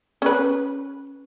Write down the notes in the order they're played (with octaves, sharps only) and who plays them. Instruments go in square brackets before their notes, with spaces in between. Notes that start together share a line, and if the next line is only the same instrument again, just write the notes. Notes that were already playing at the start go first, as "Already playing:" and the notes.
[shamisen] C#4 B4